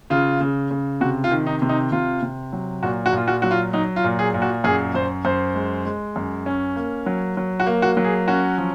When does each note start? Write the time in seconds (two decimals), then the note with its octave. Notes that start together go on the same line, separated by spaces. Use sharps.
0.10 C#3 F4
0.40 C#3
0.71 C#3
1.01 C3 F#4
1.24 F4
1.31 D#3
1.46 D#4
1.62 C3
1.69 D#4
1.92 C3 F4
2.22 C3
2.53 F#3
2.83 A#2 F#4
3.06 F#4
3.12 A#2 F4
3.28 F#4
3.42 F#3 F#4
3.51 F4
3.73 F#3 D#4
3.96 F4
4.04 A#2
4.19 G#4
4.34 A#2
4.42 F#4
4.64 F#2 G#4
4.94 F#2 C5
5.25 F#2 C5
5.55 G#3
5.85 G#3
6.16 F#2
6.46 C#4
6.76 A#3
7.06 F#3
7.37 F#3
7.60 F#4
7.67 A#3
7.82 F#4
7.97 F#3
8.04 G#4
8.28 C#4 F#4
8.58 F3